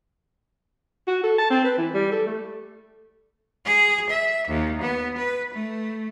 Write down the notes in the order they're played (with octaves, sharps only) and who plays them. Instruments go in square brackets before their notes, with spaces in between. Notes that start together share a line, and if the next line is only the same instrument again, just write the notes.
[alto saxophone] F#4
A4
A5
C4
B4
E3
G3
A4
A3
[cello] G#4
E5
D#2
B3
B4
A3